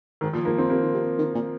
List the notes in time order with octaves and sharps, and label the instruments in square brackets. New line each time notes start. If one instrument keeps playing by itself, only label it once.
[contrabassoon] G#2 [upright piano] D#3
[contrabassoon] A#2 [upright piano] F3
[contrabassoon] G#2 [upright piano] A#3
[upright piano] C4
[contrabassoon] C3 [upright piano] A#3
[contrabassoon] D#3
C3
D#3
A#2